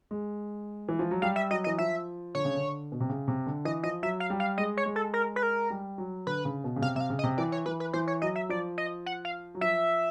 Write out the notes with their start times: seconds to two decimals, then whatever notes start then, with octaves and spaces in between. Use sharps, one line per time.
0.11 G#3
0.89 E3
0.99 F3
1.11 F#3
1.22 G3 F5
1.36 E5
1.51 F#3 D#5
1.64 E3 D#5
1.78 F3 E5
2.35 D3 C#5
2.45 C#3
2.55 D3
2.92 B2
3.00 C3
3.10 C#3
3.28 C3
3.47 D3
3.65 E3 D#5
3.83 F3 D#5
4.03 F#3 E5
4.20 F5
4.30 G3
4.40 F5
4.58 G#3 D#5
4.77 C#5
4.86 G#3
4.96 A4
5.14 A#4
5.36 B4
5.43 A#4
5.70 G3
5.98 F#3
6.27 D3 B4
6.45 C#3
6.64 B2
6.76 C#3
6.82 C3 F5
6.95 C3 E5
7.00 F5
7.10 C#3
7.19 D#5
7.24 C3
7.38 E3 D5
7.52 C#5
7.66 E3 B4
7.80 B4
7.93 E3 C5
8.08 C#5
8.22 F#3 D#5
8.36 E5
8.49 F3 D5
8.78 D#5
9.06 F#5
9.25 F5
9.55 F#3
9.61 F3 E5